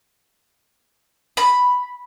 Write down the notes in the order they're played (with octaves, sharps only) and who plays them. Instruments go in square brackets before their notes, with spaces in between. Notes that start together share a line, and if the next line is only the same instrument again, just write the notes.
[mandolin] B5